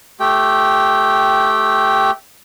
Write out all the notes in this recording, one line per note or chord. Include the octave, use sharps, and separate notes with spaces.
A3 G4 G5